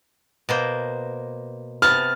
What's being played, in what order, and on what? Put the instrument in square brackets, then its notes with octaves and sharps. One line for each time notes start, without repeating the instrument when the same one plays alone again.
[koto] B2 A#3 C5
[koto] C3 B3 A5 [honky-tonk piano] F6